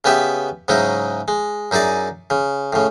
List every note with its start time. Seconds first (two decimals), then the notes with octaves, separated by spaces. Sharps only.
0.04 C#3 B3 G4 B4 E5
0.68 G#2 C#3 F#3 D#4 E4
1.28 G#3
1.71 F#2 D#4 E4 G#4 D5
2.30 C#3
2.73 A2 C#3